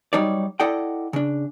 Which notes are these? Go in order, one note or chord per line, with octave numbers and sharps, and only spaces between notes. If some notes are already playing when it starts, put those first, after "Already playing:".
F#3 G3 D#4 C#5 D5
E4 A4 D5 D#5 F#5 G5
C#3 D4